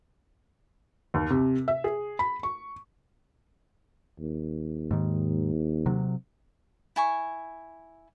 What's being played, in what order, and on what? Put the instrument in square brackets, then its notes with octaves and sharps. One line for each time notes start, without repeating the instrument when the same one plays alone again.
[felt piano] D#2
C3
E5
G#4
B5
C#6
[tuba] D#2
[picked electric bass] G#2 D#3
C3 F#3
[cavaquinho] E4 G#5 C#6